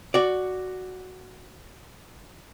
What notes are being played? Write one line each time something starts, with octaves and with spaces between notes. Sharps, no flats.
F#4 D5